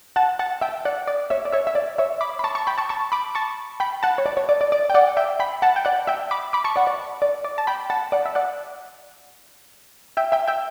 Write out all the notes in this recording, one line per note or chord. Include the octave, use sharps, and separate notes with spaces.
F#5 A5
F#5 A5
E5 G5
D5 F#5
D5
C#5 E5
D5
C#5 E5
E5
D5
C#5 E5
B5 D6
B5
A5 C#6
A5 C#6
G5 B5
A5 C#6
A5 C#6
B5 D6
A5 C#6
G5 B5
F#5 A5
C#5
D5
C#5
D5
D5
D5
G5
D5 F#5
E5 G5
G5 B5
F#5 A5
G5
D5 F#5
E5 G5
B5 D6
B5 D6
A5 C#6
D5 F#5
D5
D5
D5
A5
G5 B5
F#5 A5
D5 F#5
E5
D5 F#5
E5 G5
E5 G5
E5 G5